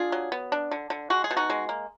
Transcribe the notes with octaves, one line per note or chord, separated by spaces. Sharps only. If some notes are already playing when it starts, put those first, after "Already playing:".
Already playing: D4 F4 G#4
F#3
B3
D4
D3
D3
G#3 F#4
G#4
B2
D#4 F#4
G#3
A#3